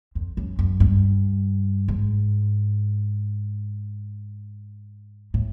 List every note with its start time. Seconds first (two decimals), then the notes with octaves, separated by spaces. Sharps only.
0.15 F2
0.37 F#2
0.59 F#2
0.80 G2
1.88 G#2
5.34 A2